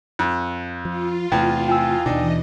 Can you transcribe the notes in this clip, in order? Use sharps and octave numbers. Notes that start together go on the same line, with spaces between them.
F2 F#6
F3 F4
E2 C3 A3 G5
G5 G#5 E6
D#2 B2 E3 D4 D#4 D#5